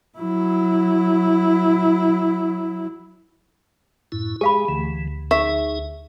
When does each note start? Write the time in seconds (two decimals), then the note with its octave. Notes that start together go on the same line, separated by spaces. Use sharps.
0.19 F#3 E4
4.12 F#2 A2 E4
4.41 G#3 G4 G#4 F5 B5
4.69 D2 E3
5.31 D#4 G#4 E5 C#6